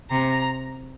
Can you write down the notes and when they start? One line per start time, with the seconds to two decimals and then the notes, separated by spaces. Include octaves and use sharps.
0.11 C3 A#5